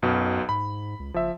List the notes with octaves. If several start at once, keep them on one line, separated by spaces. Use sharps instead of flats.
B1 F#2 B2
G#2 B5
C#2
F#1 F3 E5